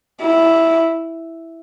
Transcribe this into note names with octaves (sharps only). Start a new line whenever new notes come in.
E4